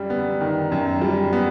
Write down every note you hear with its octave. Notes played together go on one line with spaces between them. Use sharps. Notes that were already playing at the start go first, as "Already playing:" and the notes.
Already playing: F#2 G3
B3
D#3
F#2
G3
B3